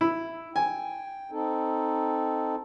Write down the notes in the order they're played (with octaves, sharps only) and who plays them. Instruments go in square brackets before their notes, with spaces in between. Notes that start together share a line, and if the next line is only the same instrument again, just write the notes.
[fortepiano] E4
[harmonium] G5 [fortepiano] G#5
[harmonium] C4 D#4 A4